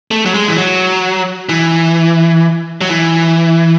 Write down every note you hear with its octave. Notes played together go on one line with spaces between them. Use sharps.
A3
F#3
G#3
E3
F#3
E3
F#3
E3